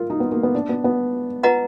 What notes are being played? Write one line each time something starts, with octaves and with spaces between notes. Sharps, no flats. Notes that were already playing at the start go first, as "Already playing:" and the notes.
Already playing: F4 A#4
D#4
B3
A#3
B3
D4
B3
B3
F4 B4 D#5 F#5 A#5